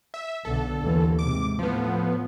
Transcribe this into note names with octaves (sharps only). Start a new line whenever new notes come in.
E5
B1 D3 A4
D#2 D3 E3
G#2 C3 D6
A2 F3 B3